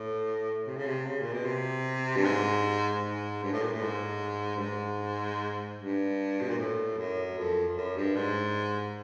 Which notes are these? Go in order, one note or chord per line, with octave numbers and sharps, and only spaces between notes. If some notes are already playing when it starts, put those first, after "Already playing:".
Already playing: A2
C3
C#3
C3
C#3
A#2
B2
C3
G2
G#2
G#2
G2
A2
A#2
A2
G#2
G2
G#2
G2
B2
A#2
A2
F#2
F2
F2
F#2
G2
G#2